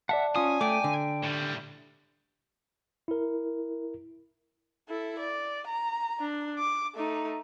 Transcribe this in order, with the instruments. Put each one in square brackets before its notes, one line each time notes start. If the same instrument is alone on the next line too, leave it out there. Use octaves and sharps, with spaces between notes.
[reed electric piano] D5 A5 [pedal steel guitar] E5 F#5
[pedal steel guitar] C#4 D#6 [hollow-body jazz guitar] F4 [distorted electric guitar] G#5
[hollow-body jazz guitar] A3 [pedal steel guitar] G5 D6
[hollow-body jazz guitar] D3
[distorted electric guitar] A2 G3
[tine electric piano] E4 A#4
[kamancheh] E4 A4
D5
A#5
D4
D6
A3 D#4